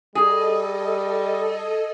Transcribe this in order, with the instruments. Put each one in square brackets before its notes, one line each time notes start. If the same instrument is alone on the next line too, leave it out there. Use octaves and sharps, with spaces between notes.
[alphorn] G3 [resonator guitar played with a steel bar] G#4 [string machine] A4 D#5